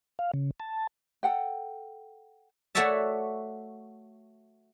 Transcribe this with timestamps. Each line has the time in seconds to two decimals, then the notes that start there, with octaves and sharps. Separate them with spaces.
0.19 F5
0.34 C#3
0.60 A5
1.23 A4 F#5 G5
2.75 A3 F#4 C#5 D5 E5 A5